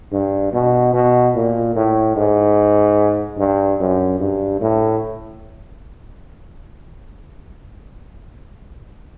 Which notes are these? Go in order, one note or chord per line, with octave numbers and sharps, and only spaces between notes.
G2
B2
B2
A#2
A2
G#2
G2
F#2
G2
A2